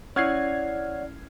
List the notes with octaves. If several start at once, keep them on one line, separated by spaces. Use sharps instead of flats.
C#4 E4 C#5 D5 F#5 F6 G#6 C7